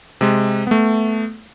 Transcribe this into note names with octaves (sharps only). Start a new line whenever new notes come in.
C3 G#3
A3 B3